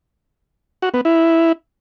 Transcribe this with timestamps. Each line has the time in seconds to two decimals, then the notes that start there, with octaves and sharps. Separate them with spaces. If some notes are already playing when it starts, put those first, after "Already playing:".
0.82 F#4
0.94 B3
1.05 E4